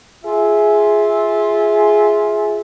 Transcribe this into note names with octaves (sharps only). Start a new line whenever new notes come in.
F4 G#4 E5